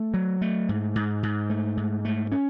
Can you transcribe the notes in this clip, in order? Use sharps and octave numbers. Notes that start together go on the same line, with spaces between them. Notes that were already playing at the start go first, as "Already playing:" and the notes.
Already playing: A3
F#3
A3
G#2
G#2
G#2
A3
G#2
A3
C#4